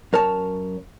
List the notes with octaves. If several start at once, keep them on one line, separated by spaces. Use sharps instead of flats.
F#2 A#4 C#5 A5